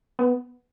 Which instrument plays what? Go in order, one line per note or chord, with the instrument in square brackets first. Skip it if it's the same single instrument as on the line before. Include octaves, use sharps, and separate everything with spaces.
[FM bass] B3